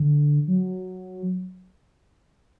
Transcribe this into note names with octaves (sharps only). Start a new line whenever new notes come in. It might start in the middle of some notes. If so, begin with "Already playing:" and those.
Already playing: D3
F#3